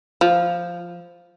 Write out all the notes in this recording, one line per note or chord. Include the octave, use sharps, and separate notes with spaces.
F3